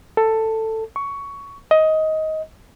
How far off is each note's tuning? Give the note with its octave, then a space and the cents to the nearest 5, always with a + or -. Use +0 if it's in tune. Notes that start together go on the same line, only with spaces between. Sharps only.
A4 +10
C#6 +15
D#5 +15